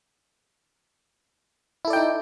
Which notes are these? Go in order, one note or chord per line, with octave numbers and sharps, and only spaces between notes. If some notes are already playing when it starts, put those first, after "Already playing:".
D#4 E4 A4 D5 G5